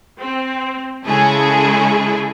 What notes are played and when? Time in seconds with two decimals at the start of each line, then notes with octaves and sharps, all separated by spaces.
0.18 C4
1.05 C#3 G#3 E4 G#4 A4